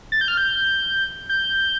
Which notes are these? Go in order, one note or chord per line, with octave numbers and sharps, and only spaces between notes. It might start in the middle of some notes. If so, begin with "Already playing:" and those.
A6
G6
F6
G6
G6